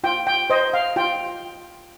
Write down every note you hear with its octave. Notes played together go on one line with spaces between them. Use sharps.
F4 G5
G5
C5 D#5
F5
F4 G5